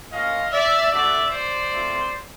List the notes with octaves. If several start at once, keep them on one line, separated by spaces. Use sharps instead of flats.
A#3 C#4 F4 D#5 F5
D5 E5
A3 D4 F#4 D5 E5
C5 D5
A3 C4 F4